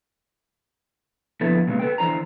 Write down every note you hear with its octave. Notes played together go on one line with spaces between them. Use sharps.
D3 F3 B3 E4 A4 B4
A#2 C#3 G#3 B3
A4 B4 G5
D3 E3 D#4 C5 A#5